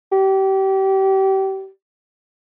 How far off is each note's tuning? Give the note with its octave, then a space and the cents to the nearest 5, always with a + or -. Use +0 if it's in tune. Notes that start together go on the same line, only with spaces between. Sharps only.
G4 -30